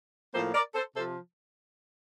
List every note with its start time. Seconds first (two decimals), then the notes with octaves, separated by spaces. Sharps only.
0.34 A2 F3 A#3 A4 C5
0.54 A#4 D5
0.75 A4 C5
0.96 C3 F3 A4 C5